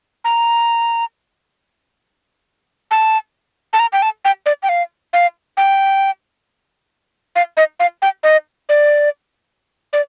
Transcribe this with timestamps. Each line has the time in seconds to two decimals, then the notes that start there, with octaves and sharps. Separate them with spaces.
0.25 A#5
2.91 A5
3.73 A5
3.80 A#5
3.93 G5
4.02 A5
4.25 G5
4.46 D5
4.63 G5
4.69 F5
5.13 F5
5.57 G5
7.36 F5
7.57 D#5
7.80 F5
8.02 G5
8.23 D#5
8.69 D5
9.93 D5